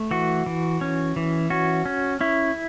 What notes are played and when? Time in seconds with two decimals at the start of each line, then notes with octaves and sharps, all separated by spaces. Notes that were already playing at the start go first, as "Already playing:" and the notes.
Already playing: A3
0.11 E3 F#4
0.46 E3
0.81 C#4
1.16 E3
1.50 C#4 F#4
1.86 C#4
2.20 C#4 E4